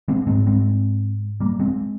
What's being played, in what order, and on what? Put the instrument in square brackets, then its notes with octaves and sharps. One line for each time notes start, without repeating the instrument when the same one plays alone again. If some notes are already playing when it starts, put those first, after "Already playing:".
[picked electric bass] G#3 C4
G#2 G#3 C4
G#3 C4
G3 A#3
G#3 C4